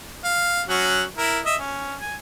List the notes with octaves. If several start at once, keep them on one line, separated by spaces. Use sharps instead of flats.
F5
F#3 C#4 F#4
E4 A#4
D#5 E5
C#4
G#5